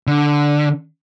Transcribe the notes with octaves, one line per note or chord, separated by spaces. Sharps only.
D3